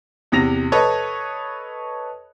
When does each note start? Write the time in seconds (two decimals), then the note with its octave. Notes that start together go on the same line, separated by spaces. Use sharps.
0.32 E2 C3 A#6 F7
0.72 A4 B4 C#5 D#5